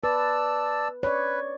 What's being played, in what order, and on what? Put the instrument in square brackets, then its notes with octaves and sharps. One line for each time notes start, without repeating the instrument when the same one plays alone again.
[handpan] B4 [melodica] D5 A5 E6
[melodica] B4 [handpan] C#5 D5